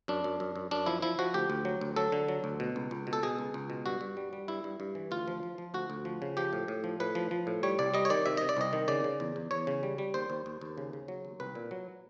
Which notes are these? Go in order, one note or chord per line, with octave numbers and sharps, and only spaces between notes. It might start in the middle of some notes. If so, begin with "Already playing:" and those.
F#2 D4
F#2
F#2
F#2
F#2 D4
F3 E4
F3 E4
F3 F#4
D2 G4
D2
F#3
D2
F#3 A4
D3
F#3
D2
B2
C#2
C#2
B2
A4
B2 G#4
C#2
C#2
B2
G2 F#4
G2
G3
G3
G2 E4
G2
G2
E3
D2 F4
F3
F3
F3
D2 F#4
D2
F3
C#3
F3 G4
A2
A2
F3
A2 B4
F3
F3
A2
G3 C#5
C2 D5
G3 D#5
C#5
D#3 D5
C3 E5
C3 D#5
D5
C2 D#5
D#3
C#3 D5
C#3
E2
E2
E2 C#5
C#3
G3
G3
D#2 C5
D#2
D#2
D#2
C#3
C#3
F#3
D#2
C2 B4
A#2
F#3